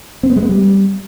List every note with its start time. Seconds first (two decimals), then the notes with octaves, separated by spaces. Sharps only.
0.23 C4
0.30 B3
0.36 G#3
0.43 B3
0.49 G3